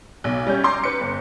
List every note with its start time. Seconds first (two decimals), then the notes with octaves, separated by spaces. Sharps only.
0.24 B1
0.47 G3 C#4 G6
0.64 A#5 C6 D6
0.84 B4 C#7
1.01 G1